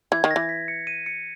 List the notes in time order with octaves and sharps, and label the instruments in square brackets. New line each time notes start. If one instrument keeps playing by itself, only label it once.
[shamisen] E3 [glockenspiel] G#6
[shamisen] D#3
[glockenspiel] A#6
[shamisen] E3
[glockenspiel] B6
C#7
D#7
C#7